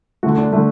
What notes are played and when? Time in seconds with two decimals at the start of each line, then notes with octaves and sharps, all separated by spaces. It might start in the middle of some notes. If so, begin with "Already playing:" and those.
0.23 D3 A3 F#4
0.37 D4
0.53 D3 A3